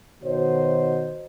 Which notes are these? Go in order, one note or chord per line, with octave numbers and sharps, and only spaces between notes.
B2 D#3 F#4 C5 C#5 D#5